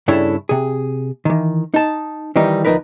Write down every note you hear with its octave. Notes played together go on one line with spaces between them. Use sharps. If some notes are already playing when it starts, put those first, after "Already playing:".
G2 C#3 D4 E4 A4 C#5
C3 G#4
D#3 E3
D#4 A5
D#3 E3 G3 D#4
D2 F3 G#3 D#4 A#4 B4